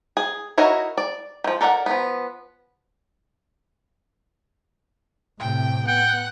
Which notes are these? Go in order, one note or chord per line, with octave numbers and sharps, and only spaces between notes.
G#4
D#4 E4 F#4 A#4 C#5
D5
D#3 F3
A4 A#4 D5 E5 F#5
F3 B3
A2 C3 G5
B3 F#5 G5